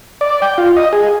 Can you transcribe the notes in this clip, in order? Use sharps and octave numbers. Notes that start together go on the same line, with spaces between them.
D5
G5
F4
D#5
G#4